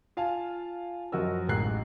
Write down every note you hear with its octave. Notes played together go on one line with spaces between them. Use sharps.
F4 F5 G#5 A5
F#2 F3 F#4 A#4 D#5 E6
A1 G#2 A#5 F#6 C7